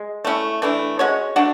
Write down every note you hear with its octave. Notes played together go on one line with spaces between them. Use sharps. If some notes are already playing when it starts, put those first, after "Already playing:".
Already playing: G#3
A3 C#4 E4
E3 A3 D4
G#3 C#4 F#4 C#5
A3 D4 F#4